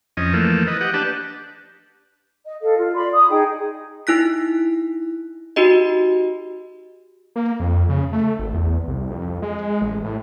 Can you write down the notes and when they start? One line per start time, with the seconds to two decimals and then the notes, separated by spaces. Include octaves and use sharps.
0.17 F2 C#4 D#5
0.33 E3 F3 A3 A#3
0.67 B4 D#5
0.81 G4 D#5 F#5
0.94 D4 G4 B4 A5
2.45 D#5
2.61 A4 D#5 F5
2.78 F4
2.95 D5 B5 C6
3.12 D#6
3.30 D#4 G#4 D#5 G5
4.07 D#4 E4 F#6 B6
5.56 D#4 F#4 G4 D#5
7.36 A#3
7.60 F2
7.89 C#3
8.13 A3
8.39 G#1
8.54 E2
8.88 C2
9.10 F2
9.42 G#3
9.82 A1
10.04 A2